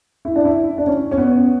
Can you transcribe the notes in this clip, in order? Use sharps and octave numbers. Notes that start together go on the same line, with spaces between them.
E4
D4
E4
D4
C#4
C#4
B3